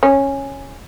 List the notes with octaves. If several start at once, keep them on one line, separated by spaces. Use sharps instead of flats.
C#4